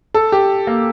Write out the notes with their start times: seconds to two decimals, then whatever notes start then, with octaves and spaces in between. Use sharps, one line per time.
0.14 A4
0.32 G4
0.67 A#3